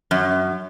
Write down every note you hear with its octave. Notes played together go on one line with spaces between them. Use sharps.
F#2